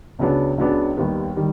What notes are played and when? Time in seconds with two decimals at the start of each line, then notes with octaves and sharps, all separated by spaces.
0.19 C#2 C#3 F#3 B3 D4
0.58 C#2 C#3 F#3 B3 D4
0.97 D#2 D#3 G3 B3
1.36 D#3 G3